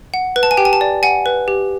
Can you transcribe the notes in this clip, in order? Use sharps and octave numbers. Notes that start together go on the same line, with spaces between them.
F#5
B4
A5
G#5
G4 G5
G#5
A5
D5
F#5 G#5
B4
G4